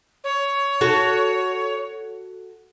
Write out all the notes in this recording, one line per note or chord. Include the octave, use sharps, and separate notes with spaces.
C#5
F#4 A4